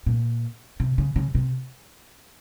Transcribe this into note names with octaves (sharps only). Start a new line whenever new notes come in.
A#2
C3
C#3
C#3
C3